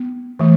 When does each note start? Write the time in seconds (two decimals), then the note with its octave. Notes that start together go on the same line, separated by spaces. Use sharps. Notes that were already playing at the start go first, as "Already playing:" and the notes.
Already playing: B3
0.39 E3 A3